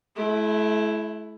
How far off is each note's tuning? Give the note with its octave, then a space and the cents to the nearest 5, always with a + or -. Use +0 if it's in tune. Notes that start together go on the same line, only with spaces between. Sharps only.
A3 -40 E4 +10